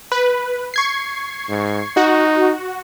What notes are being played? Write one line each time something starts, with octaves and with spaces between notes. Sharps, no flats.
B4
C#6 G#6 C7
G#2
D#4 F#4